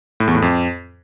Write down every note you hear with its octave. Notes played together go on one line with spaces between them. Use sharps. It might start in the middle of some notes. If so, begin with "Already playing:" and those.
A2
E2
A2
F2